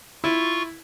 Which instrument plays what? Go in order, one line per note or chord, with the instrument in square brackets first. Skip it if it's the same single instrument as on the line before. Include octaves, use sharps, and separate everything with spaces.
[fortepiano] E4 [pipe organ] F4 C#6